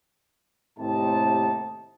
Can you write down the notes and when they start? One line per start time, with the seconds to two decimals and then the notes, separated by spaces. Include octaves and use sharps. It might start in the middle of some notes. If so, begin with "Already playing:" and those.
0.78 D#2 A2 C3 C4 D#4 A5